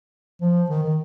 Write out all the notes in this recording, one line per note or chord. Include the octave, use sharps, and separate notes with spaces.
F3
D#3
D#3